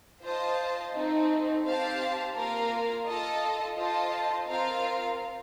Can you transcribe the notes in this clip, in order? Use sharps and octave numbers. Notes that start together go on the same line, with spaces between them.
F4 C5 D#5 A5
A3 C4 D#4
C4 G4 C5 F5 A5
A#3 F4 A#4 F5
F4 A4 D#5 A5
F4 A4 C5 D#5 A5
C4 F4 A#4 F5